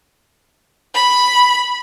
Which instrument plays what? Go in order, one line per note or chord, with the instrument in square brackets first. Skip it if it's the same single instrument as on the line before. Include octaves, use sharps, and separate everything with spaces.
[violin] B5